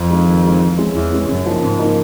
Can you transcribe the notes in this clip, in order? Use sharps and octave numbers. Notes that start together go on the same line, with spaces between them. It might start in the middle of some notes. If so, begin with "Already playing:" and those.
Already playing: F2
G#3 C4 D#4
D#3
G#3 C4 D#4
E3
G#3 C#4 E4
E2 E3
G#3 C#4 E4
F#2 C#3
F3 A#3 D#4
G#2 C#3
F3 A#3 D#4